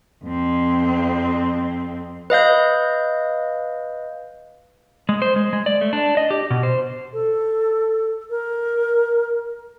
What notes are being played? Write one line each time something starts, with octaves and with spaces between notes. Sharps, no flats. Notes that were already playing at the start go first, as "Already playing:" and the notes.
F2 C4
B4 D#5 F5 G6
G#3
C5
G#3
G#3
D5
A3
D4
D#5
G4
B2
C5
A4
A#4